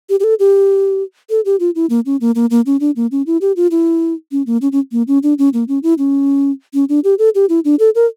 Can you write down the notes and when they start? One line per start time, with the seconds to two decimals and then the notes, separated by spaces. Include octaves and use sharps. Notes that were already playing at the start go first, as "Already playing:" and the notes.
0.09 G4
0.20 G4
0.24 A4
0.39 G4
1.30 A4
1.45 G4
1.60 F4
1.75 E4
1.90 A#3
2.06 C#4
2.21 A#3
2.35 A#3
2.51 A#3
2.66 C#4
2.80 D4
2.96 A#3
3.12 C#4
3.27 E4
3.41 G4
3.56 F4
3.71 E4
4.32 C#4
4.47 A#3
4.62 C#4
4.72 C#4
4.92 A#3
5.08 C#4
5.23 D4
5.39 C#4
5.53 A#3
5.68 C#4
5.83 E4
5.98 C#4
6.74 C#4
6.89 D4
7.04 G4
7.19 A4
7.35 G4
7.49 E4
7.65 D4
7.79 A4
7.95 A#4